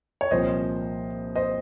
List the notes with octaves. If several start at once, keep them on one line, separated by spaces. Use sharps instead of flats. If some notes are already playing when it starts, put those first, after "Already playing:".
C#5
C2 A#2 F3 C5 D#5
C5 D#5